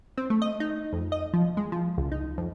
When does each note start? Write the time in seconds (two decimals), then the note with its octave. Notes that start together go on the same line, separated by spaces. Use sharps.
0.18 C4
0.30 A3
0.42 D#5
0.60 D#4
0.93 F2
1.12 D#5
1.33 F3
1.57 G#3
1.72 F3
1.98 C#2
2.12 D#4
2.38 F2